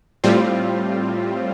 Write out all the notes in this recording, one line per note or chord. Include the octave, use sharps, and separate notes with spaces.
A2 G3 C4 F4